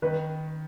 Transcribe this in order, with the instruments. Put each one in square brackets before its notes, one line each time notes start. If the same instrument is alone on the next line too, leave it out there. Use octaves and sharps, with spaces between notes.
[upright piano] D#3 [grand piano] B4